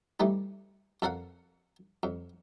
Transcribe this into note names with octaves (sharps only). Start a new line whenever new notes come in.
E3 G3 A3 D#4
F2 A4 A#4 F5 F#5
F2